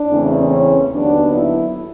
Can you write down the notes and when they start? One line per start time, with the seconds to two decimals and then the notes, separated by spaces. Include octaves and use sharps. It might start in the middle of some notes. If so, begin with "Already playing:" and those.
Already playing: D4
0.09 E2 C#3 E3 A3 C4
0.51 C#4
0.93 D#2 D3 F#3 B3 D4
1.35 E4